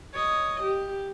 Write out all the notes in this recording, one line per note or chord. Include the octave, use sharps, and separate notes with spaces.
C#5 D#5
G4